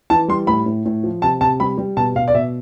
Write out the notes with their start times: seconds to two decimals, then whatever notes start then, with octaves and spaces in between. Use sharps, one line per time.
0.10 E3 A5
0.28 G3 C6
0.47 A2 B5
0.66 A2
0.85 A2
1.04 F3
1.22 C3 A5
1.41 C3 A5
1.60 G3 B5
1.78 G3
1.97 B2 A5
2.15 B2 F5
2.28 D5
2.34 B2 E5